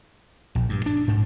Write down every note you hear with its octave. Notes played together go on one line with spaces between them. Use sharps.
A#1
G2
D4
G#2